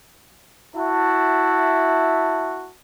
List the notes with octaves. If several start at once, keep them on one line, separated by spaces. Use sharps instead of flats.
E4 F#4 E5 A5